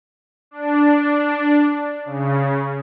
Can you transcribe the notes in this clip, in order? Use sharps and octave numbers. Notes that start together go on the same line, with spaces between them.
D4
C#3